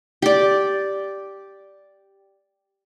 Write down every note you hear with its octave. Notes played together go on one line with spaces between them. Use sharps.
G4 D5